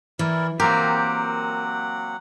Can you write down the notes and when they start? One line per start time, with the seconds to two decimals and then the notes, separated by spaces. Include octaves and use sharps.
0.19 E3 E4 A#4 D5
0.60 F#3 A#3 C4 G4 A#4 F#5